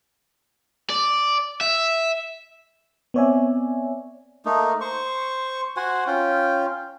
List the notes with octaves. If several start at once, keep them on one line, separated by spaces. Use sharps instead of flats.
D5
E5
B3 C4 C#5 D5 E5 G#5
A3 A#3 D#4
C5 C#6
F#4 C5 F#5 G#5
C#4 F4 G5